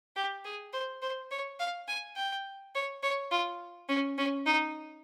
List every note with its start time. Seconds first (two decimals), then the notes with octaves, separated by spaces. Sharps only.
0.16 G4
0.45 G#4
0.73 C5
1.02 C5
1.31 C#5
1.60 F5
1.88 G#5
2.16 G5
2.75 C#5
3.03 C#5
3.31 F4
3.89 C#4
4.18 C#4
4.46 D#4